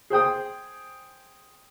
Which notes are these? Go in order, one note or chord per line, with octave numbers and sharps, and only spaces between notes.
G#4 C5 G5 D#6